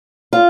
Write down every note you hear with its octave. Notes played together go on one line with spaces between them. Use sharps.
F4